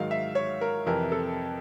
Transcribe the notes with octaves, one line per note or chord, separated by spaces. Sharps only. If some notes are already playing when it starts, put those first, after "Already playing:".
Already playing: G#2 D#3 F#3 F5
E5
C#5
A#4
F2 C3 E3 A#4
A4